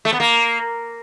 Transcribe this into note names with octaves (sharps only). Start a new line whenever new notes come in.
A3
B3
A#3